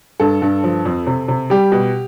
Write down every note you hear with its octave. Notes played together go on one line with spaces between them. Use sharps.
G2 A4
G2
F3
F2
C3
C3
G3 G4
B2